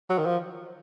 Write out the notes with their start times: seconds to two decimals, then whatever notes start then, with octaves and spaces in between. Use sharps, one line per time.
0.10 F#3
0.18 D#3
0.25 F3